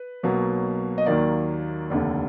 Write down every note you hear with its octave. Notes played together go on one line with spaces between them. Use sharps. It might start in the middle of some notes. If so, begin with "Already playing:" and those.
Already playing: B4
B1 B2 F#3 A#3
D#5
D#2 D#3 F#3 A#3 D5
F1 D#2 D3